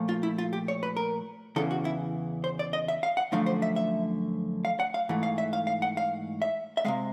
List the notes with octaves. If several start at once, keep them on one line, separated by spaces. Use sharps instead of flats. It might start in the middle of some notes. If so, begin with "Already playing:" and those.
Already playing: A#2 F3 A3
F4
E4
F4
G4
C#5
B4
A#4
E2 C#3 E3 A4
F#4
E4
C5
D5
D#5
E5
F5
F#5
F#2 D3 F3 A3 F5
C5
E5
E5
F5
F#5
F5
G#2 E3 A3
F5
E5
F5
F5
F#5
F5
E5
E5
C3 D#3 G#3 F5